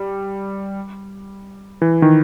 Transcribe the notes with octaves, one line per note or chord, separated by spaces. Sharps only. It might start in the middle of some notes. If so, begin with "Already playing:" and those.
Already playing: G3
E3
D#3